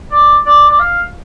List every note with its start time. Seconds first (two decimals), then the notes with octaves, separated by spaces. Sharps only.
0.11 D5
0.46 D5
0.69 D5
0.79 F5